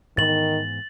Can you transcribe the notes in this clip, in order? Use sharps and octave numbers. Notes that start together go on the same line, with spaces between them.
G#2 D#3 E3 B3 A6 F#7